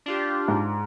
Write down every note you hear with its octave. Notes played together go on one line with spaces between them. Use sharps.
D4 F4 G4
G#2